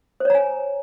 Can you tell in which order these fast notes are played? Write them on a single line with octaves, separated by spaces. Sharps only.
C5 C#5 A#5 G#5